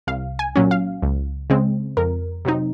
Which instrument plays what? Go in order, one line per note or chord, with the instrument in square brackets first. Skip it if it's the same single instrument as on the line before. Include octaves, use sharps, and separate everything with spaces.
[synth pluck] C2 F5
G#5
A#2 F#3 C#4
F5
C#2
C#3 G#3 C4
F2 A#4
C3 F#3 C4 D#4